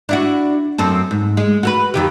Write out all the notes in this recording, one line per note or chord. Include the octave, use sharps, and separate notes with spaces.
D4 E4 F#4
F#2 C4 A4
G#2
G#3
F#4 A4 B4
F2 D#3 G4